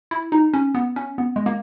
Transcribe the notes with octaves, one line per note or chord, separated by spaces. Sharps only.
E4
D#4
C#4
B3
C#4
B3
G#3
A#3